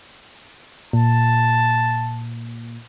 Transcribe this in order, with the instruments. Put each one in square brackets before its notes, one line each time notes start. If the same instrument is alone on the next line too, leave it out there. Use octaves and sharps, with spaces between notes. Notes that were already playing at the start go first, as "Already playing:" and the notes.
[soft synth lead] A#2 [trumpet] A5